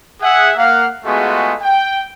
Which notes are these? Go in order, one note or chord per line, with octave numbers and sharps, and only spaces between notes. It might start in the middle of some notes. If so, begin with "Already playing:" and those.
G#4 E5 F#5
A#3 F5 F#5
G#3 A3 B3 F4 F#4 G#4
G5